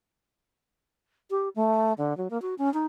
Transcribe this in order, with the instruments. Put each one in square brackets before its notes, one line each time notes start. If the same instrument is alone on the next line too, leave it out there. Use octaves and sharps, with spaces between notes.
[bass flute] G4
A3
D3
F#3
A#3
F#4
C#4
D#4